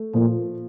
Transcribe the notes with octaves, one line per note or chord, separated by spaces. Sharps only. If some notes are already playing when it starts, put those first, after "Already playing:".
Already playing: A3
A#2 F3